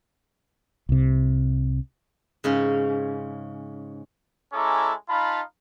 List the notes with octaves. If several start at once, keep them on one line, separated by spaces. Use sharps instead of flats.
C2 C3
G#2 C#3 C#4
G#3 C#4 E4 A4 A#5 D6
D#4 F4 F5 A5 B5